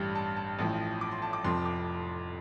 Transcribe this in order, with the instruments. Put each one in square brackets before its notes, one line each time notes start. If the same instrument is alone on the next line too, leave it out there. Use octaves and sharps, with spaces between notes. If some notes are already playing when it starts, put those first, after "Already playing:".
Already playing: [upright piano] A1 G2 G3
A5
A5
A1 A2 F3
D6
C6
A5
D6
F1 F2 F3 C6
D6